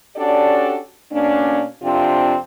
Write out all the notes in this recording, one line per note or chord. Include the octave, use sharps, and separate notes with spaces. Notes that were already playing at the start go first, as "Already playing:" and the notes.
C#4 D4 F#4 G4 A4 D5
B2 A#3 C#4 D4
F2 C3 C4 D4 F4